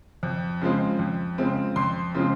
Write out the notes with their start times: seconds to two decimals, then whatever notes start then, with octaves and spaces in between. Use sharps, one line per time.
0.23 F2
0.61 C#3 F3 G#3 C4
0.99 F2
1.38 C#3 F3 G#3 C4
1.76 F2 C6
2.14 C#3 F3 G#3 C4